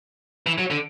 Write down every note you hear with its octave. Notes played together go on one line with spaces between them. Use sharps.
E3
F#3
D3